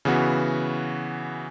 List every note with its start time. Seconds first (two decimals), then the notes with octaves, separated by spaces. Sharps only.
0.05 C#3 E3 B3 F#4